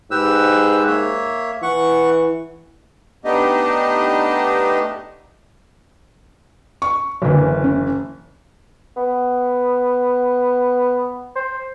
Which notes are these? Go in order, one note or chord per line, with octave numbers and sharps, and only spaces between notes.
G#2 G4 B4 E6
A#3 C#5 E5
E3 F#5 C#6
A3 B3 D4 D#4 G4 D#5
C#6
F#1 D3 E3 F#3
C#4
B3
C5